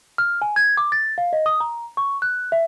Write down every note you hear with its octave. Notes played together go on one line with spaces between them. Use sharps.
F6
G#5
G#6
D6
A6
F5
D#5
D#6
A#5
C#6
F#6
E5